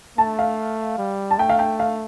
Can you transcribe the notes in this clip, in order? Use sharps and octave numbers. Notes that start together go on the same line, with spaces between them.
A3 A5
F5
G3
A5
A3 G5
F5
G5
F5